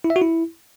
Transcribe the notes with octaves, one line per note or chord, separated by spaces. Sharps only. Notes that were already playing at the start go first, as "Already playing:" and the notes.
E4
E5
F#4
E4